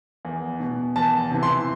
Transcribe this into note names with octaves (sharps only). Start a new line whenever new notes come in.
E2
B2
E2 A5
C3 E3
C6